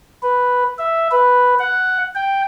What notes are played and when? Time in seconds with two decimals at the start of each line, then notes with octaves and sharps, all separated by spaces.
0.23 B4
0.79 E5
1.11 B4
1.59 F#5
2.15 G5